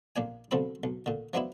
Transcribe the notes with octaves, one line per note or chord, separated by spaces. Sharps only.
A#1 A#3 D4 G#5
B1 D3 F3 C4 A4 B5
B1
A#2 D3
F3 F#3 G#3 B3 D4 E4